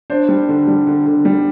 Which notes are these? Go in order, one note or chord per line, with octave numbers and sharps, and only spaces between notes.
D4 C5
G3
D3
G3
D3
D3
G3